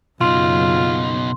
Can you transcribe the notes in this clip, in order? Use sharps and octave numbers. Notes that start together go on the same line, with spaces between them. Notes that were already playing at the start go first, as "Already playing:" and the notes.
F#1 B2 D#4 F4 C6